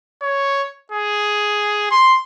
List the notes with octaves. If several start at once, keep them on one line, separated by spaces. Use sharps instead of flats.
C#5
G#4
C6